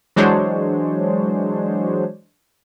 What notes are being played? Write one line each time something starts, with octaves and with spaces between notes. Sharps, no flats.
E3 F#3 G#3 D4 C5 C#5